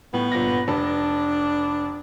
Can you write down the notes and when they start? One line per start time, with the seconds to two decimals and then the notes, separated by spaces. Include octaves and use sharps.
0.14 A2 B3
0.32 G1 A#2 A#6
0.68 F1 D4 B4 A5